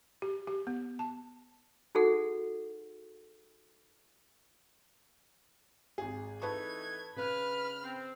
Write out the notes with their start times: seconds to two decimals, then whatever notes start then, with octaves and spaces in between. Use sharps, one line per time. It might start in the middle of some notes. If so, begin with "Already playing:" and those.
0.22 G4
0.47 G4
0.67 B3
0.99 A5
1.95 D#4 F#4 G#4 A4 F#5
5.98 G#1 G#4
6.42 E3 A3 D#4 B4 A5 C#6 G#6
7.16 C#3 B4 B5 F6
7.83 C4